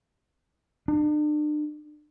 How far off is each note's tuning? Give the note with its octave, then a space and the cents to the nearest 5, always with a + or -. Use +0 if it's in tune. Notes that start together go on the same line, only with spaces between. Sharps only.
D4 +40